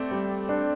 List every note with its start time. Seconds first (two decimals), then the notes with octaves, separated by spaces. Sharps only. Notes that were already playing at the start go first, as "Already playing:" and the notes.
Already playing: A3 C4 D5
0.11 G3
0.49 D4